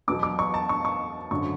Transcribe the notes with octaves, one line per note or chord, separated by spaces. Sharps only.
E2 B2 F#3 D6
D6
C#6
A5
C#6
C#6
G#1 F#2 D3 C#6